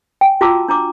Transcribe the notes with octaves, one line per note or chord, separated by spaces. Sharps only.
G5 G#5
F4 F#4 A5 A#5 D6 E6
D4 A#5 D6